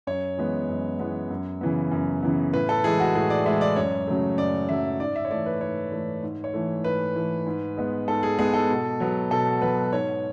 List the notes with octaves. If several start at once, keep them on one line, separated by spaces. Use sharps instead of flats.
F#2 C#5
E3 G#3 B3
F#2
E3 G#3 B3
F#2
C#3 E3 B3
F#2
C#3 E3 B3
A2 B4
A4
E3 G#3 G#4
F#4
A2 G#4
D5
E3 G#3 E5
D5
F#2 C#5
C#3 F#3 A3
F#2 D5
C#3 F#3 A3 E5
G#2 D5
E5
C#5
E3 A3 D5
B4
G#2 C#5
E3 A3
G#2
C#5
E3 A3
G#2 B4
E3 A3
G#2
G#3 B3
G#2 A4
G#4
G#3 B3 G#4
A4
B2
F#3 B3
B2 A4
F#3 B3 B4
G#2 C#5